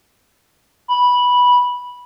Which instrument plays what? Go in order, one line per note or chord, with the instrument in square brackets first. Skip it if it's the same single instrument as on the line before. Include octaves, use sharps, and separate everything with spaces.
[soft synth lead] B5